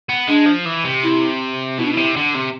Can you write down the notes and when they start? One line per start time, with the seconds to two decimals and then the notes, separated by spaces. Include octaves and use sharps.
0.09 B3
0.28 G#3 D4
0.46 F3
0.65 E3
0.84 C3
1.03 E4
1.78 B2 E4
1.85 D4
1.92 C3 E4
2.16 D3
2.34 C3